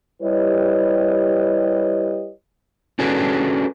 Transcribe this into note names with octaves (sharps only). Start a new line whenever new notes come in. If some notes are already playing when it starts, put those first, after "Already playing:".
G3 E4 G4 B4 C#5 D#5
C#4 D4 F#4 G#4 A4 B4